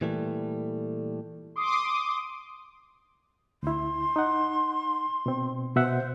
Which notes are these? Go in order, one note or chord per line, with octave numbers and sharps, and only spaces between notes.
A#2 E3 G3 A3
C6 D6 D#6
D2 E4 C6
D#4 F#5
B2 C4
B2 C5 E5 F#5